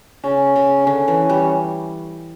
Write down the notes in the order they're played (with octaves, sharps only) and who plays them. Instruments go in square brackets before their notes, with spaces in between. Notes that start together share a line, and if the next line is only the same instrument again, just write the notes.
[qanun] C#3 [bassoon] C#4
[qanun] C#3
[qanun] D3 [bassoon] C#4
[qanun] E3
G3